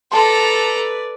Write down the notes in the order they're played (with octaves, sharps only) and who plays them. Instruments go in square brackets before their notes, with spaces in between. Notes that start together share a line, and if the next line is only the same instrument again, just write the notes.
[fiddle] A4 A#5 [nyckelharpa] B4 D5 [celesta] A5 C6